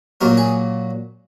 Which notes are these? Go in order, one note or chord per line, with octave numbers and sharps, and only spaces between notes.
A#2 F#3 A#4
G#4